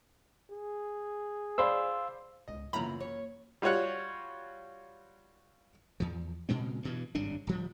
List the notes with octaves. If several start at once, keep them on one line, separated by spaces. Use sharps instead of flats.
G#4
C5 D5 F5 B5 C6 E6
C#2 G#2 D#5
F#2 C#3 E3 A#3 F4 A#5 B5
A#3 C#5
G3 F4 F#4 C#5 F#5
E2 F3
A#2 C#3 G#3 C4
G2 B2 E3
G#1 G2 C#3 D4
D1 F3 G3